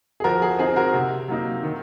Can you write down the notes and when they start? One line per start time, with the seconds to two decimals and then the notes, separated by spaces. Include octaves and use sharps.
0.20 G#4
0.24 F3 F#4 A#4
0.42 G#4
0.59 C4 D#4 G#4
0.76 F#4 A#4
0.94 C3
1.28 F#3 A#3 D#4
1.63 D#3